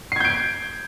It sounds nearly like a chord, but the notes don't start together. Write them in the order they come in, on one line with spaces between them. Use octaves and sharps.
C7 G#6 G6 D7